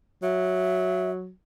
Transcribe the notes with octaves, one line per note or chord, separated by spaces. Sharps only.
F#3 E5